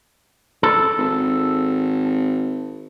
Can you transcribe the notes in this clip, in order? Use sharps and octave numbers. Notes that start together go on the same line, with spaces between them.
A4
G#1